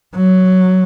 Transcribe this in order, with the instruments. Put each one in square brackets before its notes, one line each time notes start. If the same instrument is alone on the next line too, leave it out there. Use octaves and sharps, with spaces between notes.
[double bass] F#3